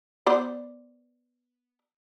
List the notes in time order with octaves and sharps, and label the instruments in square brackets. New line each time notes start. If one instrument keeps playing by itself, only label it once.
[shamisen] B3 C5 D5